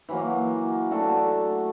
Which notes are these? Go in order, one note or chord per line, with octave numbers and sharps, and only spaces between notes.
E3 F#3 A#3
A3 D4 F#4 A4